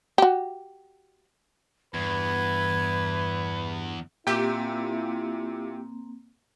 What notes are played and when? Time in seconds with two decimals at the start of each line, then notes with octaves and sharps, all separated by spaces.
0.18 F#4 G4
1.94 E2 G2 B4 G#6
4.27 A#2 A#3 C4 E4 F4 G4 E5 G6